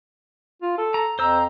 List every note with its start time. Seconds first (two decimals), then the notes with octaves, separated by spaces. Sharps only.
0.62 F4
0.78 A4
0.94 A#5
1.19 F2 C5 A#5 E6